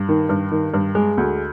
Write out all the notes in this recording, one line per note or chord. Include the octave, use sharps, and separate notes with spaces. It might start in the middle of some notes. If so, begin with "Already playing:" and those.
Already playing: G2
D#3
G2
D#3
G2
G#3
D2